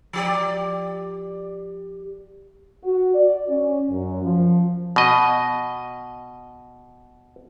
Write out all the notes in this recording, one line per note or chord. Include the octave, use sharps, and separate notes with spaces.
F3 G4 D5
F#4
D5
C#4
F#2
F3
B2 D#5